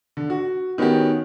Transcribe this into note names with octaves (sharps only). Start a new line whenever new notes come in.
D3
F#4
D#3 B3 C#4 F#4 G4